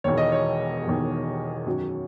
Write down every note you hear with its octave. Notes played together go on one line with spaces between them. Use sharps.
E1 E2 D#3 C#5
D#5
C#5
E1 E2 D#3
F#2 D#3 F#3